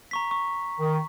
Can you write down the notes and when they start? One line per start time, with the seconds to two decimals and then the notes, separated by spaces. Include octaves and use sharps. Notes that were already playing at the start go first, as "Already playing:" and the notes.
0.11 A#5 C#6 B6
0.31 C#6
0.79 D#3